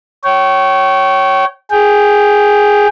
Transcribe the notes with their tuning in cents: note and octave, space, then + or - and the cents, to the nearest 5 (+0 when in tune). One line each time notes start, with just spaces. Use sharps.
C#5 +0 G5 -35
G#4 +0 G5 +0